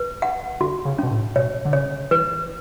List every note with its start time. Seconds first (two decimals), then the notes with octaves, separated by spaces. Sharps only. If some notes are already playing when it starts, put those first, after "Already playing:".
Already playing: B4
0.22 F#5
0.60 D3 F#4
0.85 C#3
0.99 B2 C#4
1.11 A2
1.36 B2 C#5
1.65 D3
1.73 C#3 C#5
2.11 E3 B4